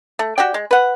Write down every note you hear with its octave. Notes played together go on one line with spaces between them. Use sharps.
A3
F#4 G4 D5 G5
G#3
B4 F#5